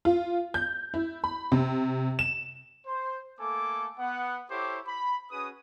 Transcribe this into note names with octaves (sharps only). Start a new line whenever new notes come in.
F4
G6
E4
B5
C3
E7
C5
A3 A#3 A4 G#5 D6
B3 F#5
E4 G4 A4 C5 C#5 D6
B5
C#4 F#4 G#4 B4 D#6